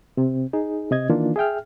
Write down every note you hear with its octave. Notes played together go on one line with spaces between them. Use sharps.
C3 C4
D#4 G#4
C3 D#5 G#6
D#3 E3 A#3 D4 F4
G#4 E5 G5 F6